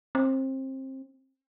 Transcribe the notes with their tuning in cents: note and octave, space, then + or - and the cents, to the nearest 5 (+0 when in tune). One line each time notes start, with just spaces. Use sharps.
C4 +25